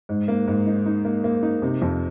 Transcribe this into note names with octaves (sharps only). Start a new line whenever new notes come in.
G#2
A#3
G#2
D#4
D#4
A#3
A#3
D#4
C3
F2